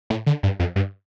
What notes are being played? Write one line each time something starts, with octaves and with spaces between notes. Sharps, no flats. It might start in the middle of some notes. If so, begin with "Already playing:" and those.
A2
D3
G2
F2
G2